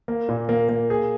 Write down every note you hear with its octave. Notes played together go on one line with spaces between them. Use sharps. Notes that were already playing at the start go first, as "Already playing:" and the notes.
A#3
A#2
A#3
A#3
G#4